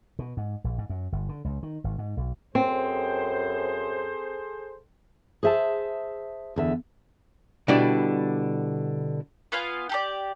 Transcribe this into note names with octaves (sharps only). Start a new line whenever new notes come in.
B2
G#2
A#1
G#2
F#2
G1
D3
C#2
D#3
G#1
G#2
B1
F#2 C4 G#4 A4 C5
G#4 C5 E5 G5 A5
E2 D3 E5
B2 D3 G3 D4 E4 D5
B3 F4 F5 G#5
G4 A4 D5